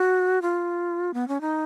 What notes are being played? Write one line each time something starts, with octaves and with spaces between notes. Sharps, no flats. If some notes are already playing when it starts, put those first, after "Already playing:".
Already playing: F#4
F4
B3
C#4
D#4